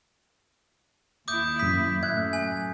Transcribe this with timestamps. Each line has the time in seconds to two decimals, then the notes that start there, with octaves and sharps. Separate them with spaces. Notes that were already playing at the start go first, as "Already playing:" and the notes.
1.28 D#2 E4 D6 D#6 G6
1.59 F#2 D#6 B6
2.03 F#2 A2 E5 F#6 G#6
2.33 G#5